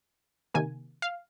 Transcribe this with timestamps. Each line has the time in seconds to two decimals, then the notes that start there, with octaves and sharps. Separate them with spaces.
0.54 C3 D#3 A#3 G#5
1.02 F5